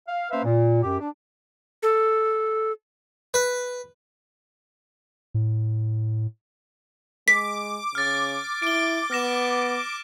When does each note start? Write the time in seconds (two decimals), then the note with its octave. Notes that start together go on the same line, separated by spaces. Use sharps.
0.07 F5
0.31 A#3 C#4 B4 C5 E5 F5
0.44 A#2
0.82 F#2 G4
0.99 D4
1.83 A4
3.34 B4
5.34 A2
7.28 G#3 D6 B6
7.95 C#3 F6 A6
8.62 E4 D7 G7
9.11 B3 F6 A#6 E7